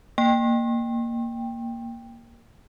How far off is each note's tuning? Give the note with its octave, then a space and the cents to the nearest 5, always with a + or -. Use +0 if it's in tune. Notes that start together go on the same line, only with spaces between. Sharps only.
A#3 +0 G5 +10